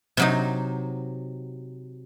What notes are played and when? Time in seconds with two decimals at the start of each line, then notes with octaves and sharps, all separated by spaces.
0.17 C3 F#3 D#4